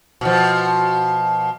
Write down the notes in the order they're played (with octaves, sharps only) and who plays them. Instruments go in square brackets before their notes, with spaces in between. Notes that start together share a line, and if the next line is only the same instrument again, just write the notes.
[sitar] B2 F3